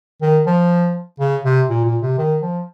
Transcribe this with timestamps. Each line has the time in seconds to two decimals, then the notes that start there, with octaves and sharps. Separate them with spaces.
0.21 D#3
0.46 F3
1.19 C#3
1.44 C3
1.69 A#2
1.85 A#2
2.02 C3
2.18 D#3
2.42 F3